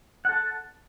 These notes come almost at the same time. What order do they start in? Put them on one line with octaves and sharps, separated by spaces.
F#5 A4 A5